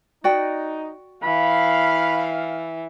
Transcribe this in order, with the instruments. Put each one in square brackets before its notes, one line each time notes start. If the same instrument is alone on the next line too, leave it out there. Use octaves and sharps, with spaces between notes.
[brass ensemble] D#4 [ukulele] F#4 D5 G5
[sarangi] E3 [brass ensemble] F5 [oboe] B5